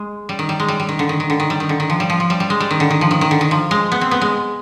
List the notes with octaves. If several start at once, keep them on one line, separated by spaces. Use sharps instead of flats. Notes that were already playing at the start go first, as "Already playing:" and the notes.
Already playing: G#3
G3
D#3
G3
G#3
G3
G3
D#3
D3
D#3
D#3
D3
D#3
G3
D#3
D3
D#3
F3
G3
F3
F3
G3
G3
G#3
G3
D#3
D3
D#3
F3
D#3
D#3
D3
D#3
F3
G#3
B3
C4
B3
G#3